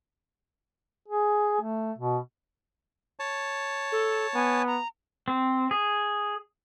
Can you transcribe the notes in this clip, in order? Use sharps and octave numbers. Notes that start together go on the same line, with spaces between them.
G#4
A3
B2
C#5 A5
A4
B3 G#5
A#5
C4
G#4